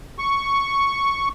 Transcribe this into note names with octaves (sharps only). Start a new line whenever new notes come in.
C#6